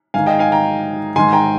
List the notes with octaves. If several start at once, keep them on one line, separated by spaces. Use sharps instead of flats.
G#2 D#3 F5 G#5
D#5 G5
F5 G#5
G5 A#5
G#2 D#3 G#5 C6
G5 A#5